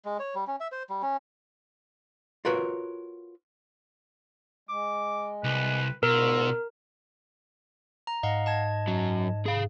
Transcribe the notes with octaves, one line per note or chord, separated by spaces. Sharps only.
G#3
C#5
G3
C#4
E5
C5
G3
C#4
F4 F#4 A#4 B4 C#5
G#3 D6
C2 B4
D2 G#2 B2 F4 A#4 E6
A#5
G#2 D#5 F5 F#5
D#5 A5 G#6
F#2 F#3
G#4 F5